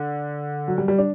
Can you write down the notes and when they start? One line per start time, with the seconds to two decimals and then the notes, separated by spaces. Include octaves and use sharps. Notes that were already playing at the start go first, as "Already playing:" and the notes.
Already playing: D3
0.68 F#3
0.78 G3
0.88 G3
0.98 D4